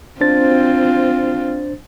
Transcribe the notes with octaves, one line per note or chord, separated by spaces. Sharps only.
C4 D4 F4 C5 A6